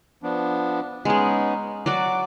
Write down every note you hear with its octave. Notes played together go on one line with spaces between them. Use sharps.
F3 B3 D4
G#3 B3 C#4 D#4 G#4
F#3 F#4 D5 D6